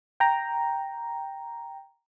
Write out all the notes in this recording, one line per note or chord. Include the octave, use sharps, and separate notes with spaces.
G5 A#5